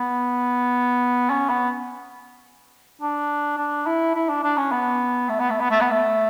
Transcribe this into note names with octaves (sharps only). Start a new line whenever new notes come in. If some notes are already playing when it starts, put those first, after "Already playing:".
Already playing: B3
C#4
B3
D4
D4
E4
E4
D4
D4
C#4
B3
A3
B3
A3
B3
A3
B3
A3